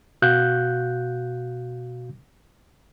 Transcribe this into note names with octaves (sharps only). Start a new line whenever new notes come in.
B2 F#4 F5 F#6 G6